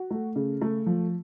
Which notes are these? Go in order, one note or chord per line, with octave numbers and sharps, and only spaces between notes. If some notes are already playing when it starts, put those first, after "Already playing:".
Already playing: F#4
A3
C#3
A3
F3